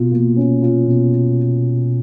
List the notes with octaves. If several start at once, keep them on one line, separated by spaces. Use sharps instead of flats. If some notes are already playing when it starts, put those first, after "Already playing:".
Already playing: B2 F4
A#3
C#4
F4
B2